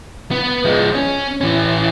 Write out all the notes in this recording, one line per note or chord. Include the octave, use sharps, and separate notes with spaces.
B3
F3 G#3
C#4
E3 C#4